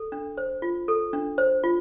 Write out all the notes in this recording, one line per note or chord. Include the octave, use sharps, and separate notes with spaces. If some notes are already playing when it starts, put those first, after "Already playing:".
Already playing: A4
D4
C5
F4
A4
D4
C5
F4